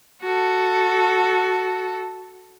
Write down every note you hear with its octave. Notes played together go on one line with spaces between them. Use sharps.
F#4 A4